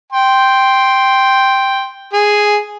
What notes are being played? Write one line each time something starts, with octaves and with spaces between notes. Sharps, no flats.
G5 C6
G#4